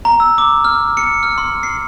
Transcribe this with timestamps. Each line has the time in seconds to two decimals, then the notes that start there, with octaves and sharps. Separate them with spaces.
0.05 A#5
0.20 E6
0.38 D6
0.65 F6
0.97 C#7
1.23 F6
1.38 C6
1.63 C7